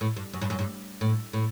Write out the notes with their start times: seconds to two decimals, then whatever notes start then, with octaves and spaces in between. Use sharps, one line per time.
0.01 A2
0.17 G2
0.33 F#2
0.41 G2
0.50 F#2
0.59 G2
1.01 A2
1.33 A2